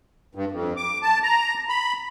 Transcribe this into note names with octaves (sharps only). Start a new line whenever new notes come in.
G2
F2
D6
A5
A#5
B5